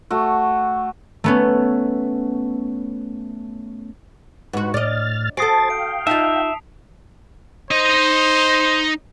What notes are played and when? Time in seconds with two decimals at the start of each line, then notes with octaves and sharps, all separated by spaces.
0.10 A3 F#4
1.24 A3 B3 C#4
4.53 G#2 F#4 B4 F#5
4.74 A2 D5 D#5 F6 A6
5.37 F#4 A4 C5 G#5 D#6 A6 C7 D7
5.70 F5 G5 D7
6.07 D#4 F4 E5 A5 B6 F7
7.71 D#4 C5 D#5